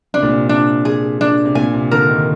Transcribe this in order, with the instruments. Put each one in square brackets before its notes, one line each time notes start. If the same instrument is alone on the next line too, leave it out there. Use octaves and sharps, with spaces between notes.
[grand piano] C3 [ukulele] D4
[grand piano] A#2
C3
[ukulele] D4
G#4
D4
[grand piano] C3
[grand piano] A#2 [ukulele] G#5
[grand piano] C3
[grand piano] D3 [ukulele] A#4
[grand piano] D#3